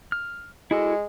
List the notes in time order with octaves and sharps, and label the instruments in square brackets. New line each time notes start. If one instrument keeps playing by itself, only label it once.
[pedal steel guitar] F6
[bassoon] G#3 [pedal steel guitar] E4 F#4 A4